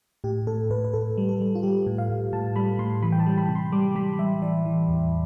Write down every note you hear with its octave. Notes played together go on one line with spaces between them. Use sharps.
A2 G4
A2 A4
A2 B4
B4
A2 A4
G3
A4
G3
F4
G3 G4
A2
F5
A2
A2 A5
G3 B5
A2 C6
E3 B5
G5
A5
G3
B5
C3
C6
G3 D6
G3 B5
G3 E5
E3 D5
E3
E2